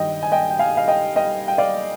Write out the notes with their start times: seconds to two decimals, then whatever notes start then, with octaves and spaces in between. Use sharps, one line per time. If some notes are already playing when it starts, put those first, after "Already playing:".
Already playing: G2 D#3 G3 D#5 G5
0.23 G#5
0.32 D#5 G5
0.50 G5
0.59 F5 G#5
0.77 F5
0.88 D#5 G5
1.16 D#5 G5
1.48 G5
1.58 D5 F5